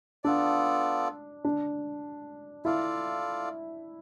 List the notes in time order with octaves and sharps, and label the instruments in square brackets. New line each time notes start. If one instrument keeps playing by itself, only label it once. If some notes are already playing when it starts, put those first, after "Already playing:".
[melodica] B3 F4 A4 D5 [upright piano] D4
[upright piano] D4
[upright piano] E4 [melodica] F4 A4 D5 F5